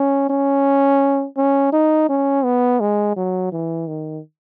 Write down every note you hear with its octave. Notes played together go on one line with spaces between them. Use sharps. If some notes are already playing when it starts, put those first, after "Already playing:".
Already playing: C#4
C#4
C#4
D#4
C#4
B3
G#3
F#3
E3
D#3